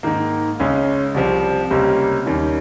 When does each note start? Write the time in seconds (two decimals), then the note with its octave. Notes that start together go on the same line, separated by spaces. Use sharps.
0.03 G#2 D#3 A#3
0.60 C#2 C#3 G#3 C#4 G#4
1.14 C2 C3 F3
1.70 C#2 C3 G3 A#3 C#4
2.26 D#2 D#3 G3 C#4